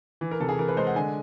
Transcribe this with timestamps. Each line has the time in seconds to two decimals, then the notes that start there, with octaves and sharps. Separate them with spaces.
0.21 E3
0.31 A#4
0.40 C3 A4
0.49 G#4
0.58 E3 A#4
0.68 B4
0.77 G#3 C5
0.87 F#5
0.95 D3 G#5